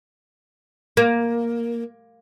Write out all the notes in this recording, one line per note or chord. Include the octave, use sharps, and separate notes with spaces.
A#3